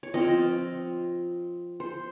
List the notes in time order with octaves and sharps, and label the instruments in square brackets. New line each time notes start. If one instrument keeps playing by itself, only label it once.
[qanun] C#5
F3 C4 F4 D#5
C5